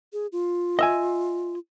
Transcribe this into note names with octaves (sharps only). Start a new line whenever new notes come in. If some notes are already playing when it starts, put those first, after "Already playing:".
G#4
F4
D#5 E5 G#5